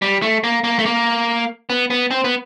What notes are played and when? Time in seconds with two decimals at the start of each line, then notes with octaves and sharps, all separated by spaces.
0.02 G3
0.22 A3
0.44 A#3
0.64 A#3
0.79 A3
0.86 A#3
1.70 B3
1.90 B3
2.11 C4
2.24 B3